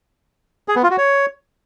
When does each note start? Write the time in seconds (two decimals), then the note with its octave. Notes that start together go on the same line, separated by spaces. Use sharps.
0.68 G#4
0.76 B3
0.83 F4
0.91 F#4
0.98 C#5